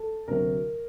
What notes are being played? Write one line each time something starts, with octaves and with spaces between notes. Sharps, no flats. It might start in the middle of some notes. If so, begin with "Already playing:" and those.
Already playing: A4
D2 C3 F#3 A#4